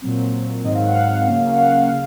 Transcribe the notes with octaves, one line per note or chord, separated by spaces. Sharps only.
A#2 F#3 C4
G#2 D#3 F#3 C4 D#5
F5
F#5
F5
C#3 F#3 A#3 C#4
F#5
F5
C#3